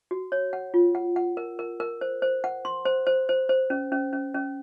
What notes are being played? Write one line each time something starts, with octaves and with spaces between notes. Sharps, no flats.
F#4
C#5
F#5
F4
F#5
F#5
A#4
A#4
A#4
C5
C5
F#5
C6
C5
C5
C5
C5
C#4
C#4
C#4
C#4